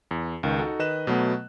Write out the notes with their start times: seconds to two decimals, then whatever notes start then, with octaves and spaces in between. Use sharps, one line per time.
0.11 E2
0.43 C#2 D#3
0.59 D#4 F#4 A4
0.79 D#3 B4 D#5 F#6 E7
1.07 B2 F#3 A3 B3